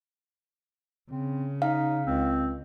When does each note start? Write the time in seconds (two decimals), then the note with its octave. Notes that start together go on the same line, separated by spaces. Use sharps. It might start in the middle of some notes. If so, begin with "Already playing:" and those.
1.11 C#3 C4
1.62 D#4 F5
2.06 C#2 C4